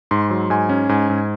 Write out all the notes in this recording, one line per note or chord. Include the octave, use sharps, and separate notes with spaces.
G#2 C6
F#3
G#2 G#5
C#4
G#2 G#5
G#2